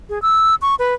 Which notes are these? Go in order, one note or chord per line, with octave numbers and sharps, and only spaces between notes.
G#4
E6
C#6
B4